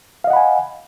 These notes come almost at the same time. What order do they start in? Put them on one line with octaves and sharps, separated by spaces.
F5 D#5 F#5 B5 G#5